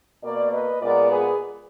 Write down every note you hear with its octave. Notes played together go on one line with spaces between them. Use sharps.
B2 A#3 A#4 D5
B4 D#5
A#2 G#3 B3 A#4 D5
G#4 B4